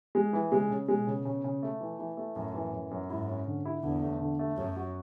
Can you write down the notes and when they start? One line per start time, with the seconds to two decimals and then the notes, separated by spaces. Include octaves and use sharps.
0.15 G#3
0.33 E3
0.52 C#3 G#3
0.70 C#3
0.88 B2 G#3
1.07 C#3
1.25 C#3
1.44 C#3
1.63 A3
1.80 E3
1.99 E3
2.17 A3
2.36 F#2 A2
2.54 E3
2.73 F#2
2.91 F#2
3.10 G#2 E4
3.28 C#4
3.47 D3
3.65 E4
3.83 E2 D3
4.02 A3
4.21 D3
4.39 A3
4.57 F#2 F#3
4.76 F#4